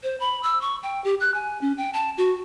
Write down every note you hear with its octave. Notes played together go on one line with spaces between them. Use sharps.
C5
B5
E6
C#6
G5
G4
F#6
G#5
C#4
G5
A5
F#4